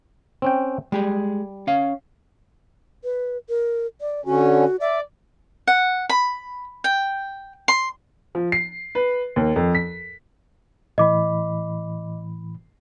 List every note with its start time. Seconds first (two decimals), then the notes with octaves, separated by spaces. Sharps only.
0.42 C4 C#4 G5
0.92 G3 G#3 G4 G#4
1.67 C#4 F5
3.04 B4
3.49 A#4
4.01 D5
4.26 D3 C#4 F#4
4.81 D5 E5
5.67 F#5
6.10 B5
6.84 G5
7.68 C6
8.35 F3
8.52 C7
8.95 B4
9.36 D#2
9.56 F2
9.75 B6
10.98 A2 E3 D#5 B5 D6